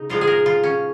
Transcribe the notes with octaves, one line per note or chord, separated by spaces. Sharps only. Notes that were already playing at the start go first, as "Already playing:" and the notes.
Already playing: C#3 D#4
A#2 F3 G#3 F4
G#4
A#4
F4
C#4